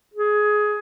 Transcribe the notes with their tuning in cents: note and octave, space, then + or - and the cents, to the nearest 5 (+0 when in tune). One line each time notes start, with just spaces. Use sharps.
G#4 +15